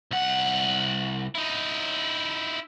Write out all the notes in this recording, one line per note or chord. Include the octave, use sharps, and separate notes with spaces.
C2 F#5
D#4 E4